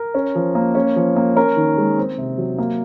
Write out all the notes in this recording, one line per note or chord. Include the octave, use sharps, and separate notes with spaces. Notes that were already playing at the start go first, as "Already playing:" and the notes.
Already playing: A#4
C#4
F3
A#3
C#4
F3
A#3
C#4 A#4
D#3
G#3
C4
C3
F#3
A#3